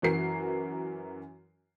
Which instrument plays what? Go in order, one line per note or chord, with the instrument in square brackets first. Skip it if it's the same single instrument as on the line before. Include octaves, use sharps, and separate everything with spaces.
[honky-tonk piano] F#2 E3 F#4 A#4 C7